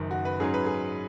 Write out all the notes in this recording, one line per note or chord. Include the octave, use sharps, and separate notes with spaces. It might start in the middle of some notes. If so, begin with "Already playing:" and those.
Already playing: F#1 F#2 D#3
F#4
B4
G#2 F#3 C#4 G#4
B4
G#4